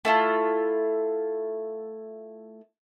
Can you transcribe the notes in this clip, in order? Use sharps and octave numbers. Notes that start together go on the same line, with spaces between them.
A3 E4 F4